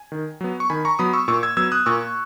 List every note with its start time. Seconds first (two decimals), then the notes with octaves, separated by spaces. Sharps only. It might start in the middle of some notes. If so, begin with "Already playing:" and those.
Already playing: G#5
0.12 D#3
0.41 F#3 B3
0.60 C#6
0.70 D#3 G#5 B5
0.85 A#5 C#6
0.99 F#3 B3 B5 D#6
1.13 C#6 E6
1.28 A#2 C#6 E6
1.43 E6 G#6
1.57 F#3 B3 E6 G#6
1.72 D#6 F#6
1.86 A#2 C#6 E6